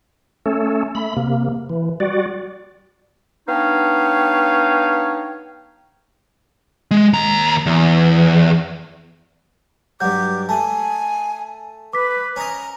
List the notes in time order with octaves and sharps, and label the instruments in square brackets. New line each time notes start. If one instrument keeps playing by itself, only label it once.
[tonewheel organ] A3 C#4 A4
A3 B5
C3 A#3
E3
G3 F#4 D5
[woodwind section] B3 D4 D#4 C#5 F5 G5
[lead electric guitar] G#3
D#2 A#5
E2
[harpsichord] G2 F#3 [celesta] F#5 G6 [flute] D6
[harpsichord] A3 [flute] G#5 [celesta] A5
[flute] B4 [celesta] D6 B6
[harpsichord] C#4 D#5 [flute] A#5